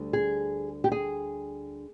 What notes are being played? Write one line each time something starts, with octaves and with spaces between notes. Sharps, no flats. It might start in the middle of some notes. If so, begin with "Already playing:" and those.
Already playing: D2 D3 G3
G#4
G4
G#4